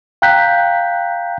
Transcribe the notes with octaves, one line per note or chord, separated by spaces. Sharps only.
F5 G5 A#5 F#6 G6 B6